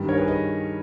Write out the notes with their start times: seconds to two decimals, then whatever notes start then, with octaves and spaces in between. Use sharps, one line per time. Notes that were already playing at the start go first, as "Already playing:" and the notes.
Already playing: G2 D#3 G3
0.08 A#4 C#5
0.18 G#4 B4
0.28 B4 D#5